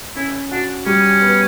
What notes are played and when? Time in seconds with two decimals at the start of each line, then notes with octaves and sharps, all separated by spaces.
0.16 C#4 E4
0.51 D4 F#4
0.86 G3 C#4
1.22 B3